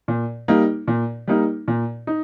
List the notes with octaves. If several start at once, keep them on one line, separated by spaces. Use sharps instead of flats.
A#2
G3 A#3 D#4
A#2
G3 A#3 D#4
A#2
D#4